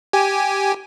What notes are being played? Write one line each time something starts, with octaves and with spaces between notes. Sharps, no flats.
G4 G#5